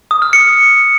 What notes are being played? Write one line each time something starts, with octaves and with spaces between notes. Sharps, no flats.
D#6
F6
C#7